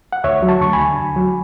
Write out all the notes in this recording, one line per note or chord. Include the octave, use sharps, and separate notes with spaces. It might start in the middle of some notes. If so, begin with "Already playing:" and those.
F#5
D2 C#5 E5
F#3
A5 C#6
D2 C#6
G#5 B5
D3
D2
F#3